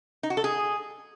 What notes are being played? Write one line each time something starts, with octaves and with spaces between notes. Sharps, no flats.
D#4
F#4
A4
G#4